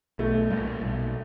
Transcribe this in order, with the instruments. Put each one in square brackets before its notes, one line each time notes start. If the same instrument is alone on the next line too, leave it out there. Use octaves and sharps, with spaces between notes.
[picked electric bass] B1 [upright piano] A3
[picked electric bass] A#2 G3 A#3
B1